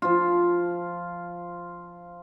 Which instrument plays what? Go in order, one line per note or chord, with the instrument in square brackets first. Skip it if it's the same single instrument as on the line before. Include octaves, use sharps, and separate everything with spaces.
[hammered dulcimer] F3 F4